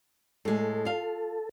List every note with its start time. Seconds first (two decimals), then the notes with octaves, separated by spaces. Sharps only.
0.45 A2 G#3 A4
0.85 F4 F5